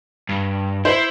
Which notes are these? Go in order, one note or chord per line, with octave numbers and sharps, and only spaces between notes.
G2
E4 C5